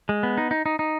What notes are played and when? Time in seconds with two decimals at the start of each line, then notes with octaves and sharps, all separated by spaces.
0.09 G#3
0.23 B3
0.38 D#4
0.51 D#4
0.66 D#4
0.79 D#4